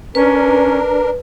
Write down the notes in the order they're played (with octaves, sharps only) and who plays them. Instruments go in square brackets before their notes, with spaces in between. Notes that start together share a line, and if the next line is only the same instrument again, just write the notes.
[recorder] C#4 [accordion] D4 A#4 [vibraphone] B4